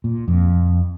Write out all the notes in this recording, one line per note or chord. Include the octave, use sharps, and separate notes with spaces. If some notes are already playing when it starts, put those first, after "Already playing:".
A#2
F2